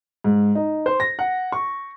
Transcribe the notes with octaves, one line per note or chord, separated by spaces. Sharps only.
G#2
D#4
C5
A#6
F#5
C#6